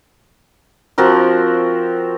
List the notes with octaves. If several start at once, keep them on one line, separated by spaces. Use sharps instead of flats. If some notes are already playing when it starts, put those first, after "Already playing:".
F3 C4 F#4 A#4